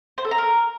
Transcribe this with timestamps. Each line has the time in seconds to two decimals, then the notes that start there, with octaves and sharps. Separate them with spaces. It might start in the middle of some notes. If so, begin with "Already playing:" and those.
0.18 C5
0.25 A4
0.31 A#5
0.38 A#4